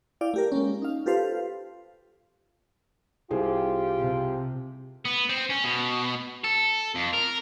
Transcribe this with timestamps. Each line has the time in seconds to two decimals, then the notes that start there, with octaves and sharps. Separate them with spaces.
0.21 E4 D5 F5 G5
0.34 A3 G4 A#4
0.52 G#3 A#3 C#4
0.82 D#4 F5
1.06 F4 G4 A4 B4 C5 F5
3.31 C2 F4 G4 G#4 C5
3.99 C3
5.05 B3
5.30 C4
5.50 C#4
5.64 B2
6.44 A4
6.95 F2
7.13 A#4